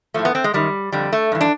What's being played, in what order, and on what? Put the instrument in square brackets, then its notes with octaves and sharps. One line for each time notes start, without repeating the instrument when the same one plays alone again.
[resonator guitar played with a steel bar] A2 F3 A3
B3
C4
G#3
F#2 D#3 G3
F2 D3 G3
A3
G2 E3
D4